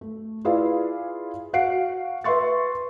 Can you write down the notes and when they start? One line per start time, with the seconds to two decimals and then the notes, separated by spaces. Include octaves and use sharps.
0.01 A3
0.45 E4 F4 G#4 B4 D5 F5
1.53 F#4 F5 F#5 C7 D7
2.24 B4 E5 C6 C#6 A6